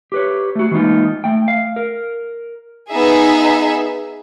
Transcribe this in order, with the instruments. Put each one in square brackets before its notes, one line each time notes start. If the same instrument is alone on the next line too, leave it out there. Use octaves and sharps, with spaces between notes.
[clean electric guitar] G4 B4 C#5
A3 F#4
E3 G#3 A#3 D#4 F4
A3 G5
F5
A#4
[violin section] B3 D#4 G#4 E5